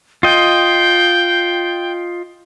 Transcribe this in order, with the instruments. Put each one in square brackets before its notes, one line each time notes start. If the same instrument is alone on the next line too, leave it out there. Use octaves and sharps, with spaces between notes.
[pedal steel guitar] F4 D#5 [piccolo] G5